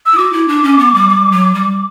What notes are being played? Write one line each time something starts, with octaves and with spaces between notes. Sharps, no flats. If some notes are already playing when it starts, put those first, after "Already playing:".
E6
E4
F#4 D6
E4
D4
C#4
B3
G3
G3
F#3
G3